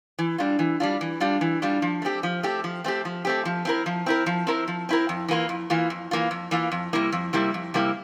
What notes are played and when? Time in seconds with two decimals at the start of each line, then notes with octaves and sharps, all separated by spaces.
0.19 E3
0.38 G3 D4 F4
0.59 E3
0.80 G3 D4 F4
1.01 E3
1.20 G3 D4 F4
1.41 E3
1.62 G3 D4 F4
1.82 F3
2.02 A3 C4 G4
2.23 F3
2.43 A3 C4 G4
2.64 F3
2.84 A3 C4 G4
3.05 F3
3.25 A3 C4 G4
3.45 F3
3.65 C4 E4 A#4
3.86 F3
4.06 C4 E4 A#4
4.26 F3
4.47 C4 E4 A#4
4.68 F3
4.89 C4 E4 A#4
5.09 F2
5.28 E3 A#3 F4
5.49 F2
5.70 E3 A#3 F4
5.90 F2
6.11 E3 A#3 F4
6.31 F2
6.51 E3 A#3 F4
6.72 F2
6.93 C3 G3 A#3 E4
7.12 F2
7.33 C3 G3 A#3 E4
7.54 F2
7.74 C3 G3 A#3 E4